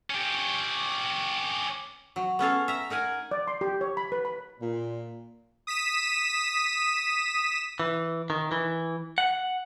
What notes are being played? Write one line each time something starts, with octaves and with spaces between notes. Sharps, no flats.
C#4 G4
F#3
B3 C#4 A4 F5
E5 A#5
D#4 A#4 F#5 G#5
D5
C6
G4
C#5
B5
B4
B5
A#2
D#6 B6 D#7 E7
E3
D#3
E3
F#5